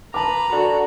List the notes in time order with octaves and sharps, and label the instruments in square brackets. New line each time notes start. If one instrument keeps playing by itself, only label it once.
[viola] B4 [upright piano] A5 D6 [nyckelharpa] A#5
[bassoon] D3 [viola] F#4